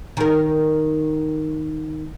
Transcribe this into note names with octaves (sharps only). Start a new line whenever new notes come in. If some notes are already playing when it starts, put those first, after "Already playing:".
D#3 A#4